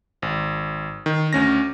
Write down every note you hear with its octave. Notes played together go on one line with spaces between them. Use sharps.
G#1
D#3
D2 C#4 A#6